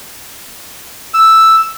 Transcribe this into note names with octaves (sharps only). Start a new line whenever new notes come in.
E6